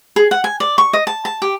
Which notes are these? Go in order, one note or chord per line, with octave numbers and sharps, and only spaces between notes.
G#4
F#5
G#5
D5
C#6
D#5
A5
A5
G4